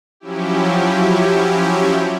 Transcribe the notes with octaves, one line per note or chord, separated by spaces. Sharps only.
F3 F#3 C#4 E4 G4